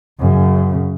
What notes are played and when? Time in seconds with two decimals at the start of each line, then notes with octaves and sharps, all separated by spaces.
0.19 F#2 C#3